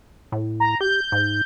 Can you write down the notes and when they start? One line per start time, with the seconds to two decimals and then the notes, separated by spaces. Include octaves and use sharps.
0.32 A2
0.60 A#5
0.81 G4 G6
1.12 G#2